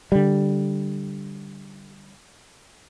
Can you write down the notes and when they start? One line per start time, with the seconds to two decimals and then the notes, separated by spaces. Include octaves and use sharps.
0.12 D3 G3